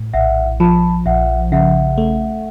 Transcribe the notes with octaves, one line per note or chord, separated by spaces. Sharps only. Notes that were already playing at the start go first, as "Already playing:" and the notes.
Already playing: A2
A#1 E5 F#5
F3 A5 B5
A#1 E5 F#5
C#3 E5 F#5
A3